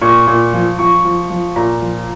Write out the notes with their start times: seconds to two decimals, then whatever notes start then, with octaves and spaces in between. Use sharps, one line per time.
0.01 A#2 C#6
0.27 A#2
0.53 F3
0.79 F3 C#6
1.04 F3
1.30 F3
1.56 A#2 A#5
1.81 F3